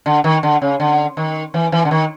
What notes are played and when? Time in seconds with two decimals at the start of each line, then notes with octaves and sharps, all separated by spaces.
0.06 D3
0.24 D#3
0.43 D3
0.62 C#3
0.80 D3
1.17 D#3
1.54 E3
1.72 E3
1.85 D3
1.91 D#3